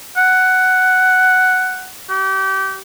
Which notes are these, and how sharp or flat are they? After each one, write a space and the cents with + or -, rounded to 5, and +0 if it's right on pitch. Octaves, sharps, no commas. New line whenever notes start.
F#5 +5
G4 -30